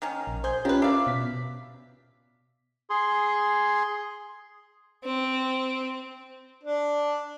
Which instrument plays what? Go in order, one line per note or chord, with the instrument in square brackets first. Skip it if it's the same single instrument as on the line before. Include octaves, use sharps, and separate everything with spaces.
[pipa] D#3 A#3 C#4
[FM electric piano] A#1
[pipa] G#4 [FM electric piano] C5 G6
[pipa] D#3 B4 [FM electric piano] C#4 F4 G4
[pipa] D4 D5 [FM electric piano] E5 F5
[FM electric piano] B2 B6
[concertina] G#4 C6
[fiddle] C4
[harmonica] D4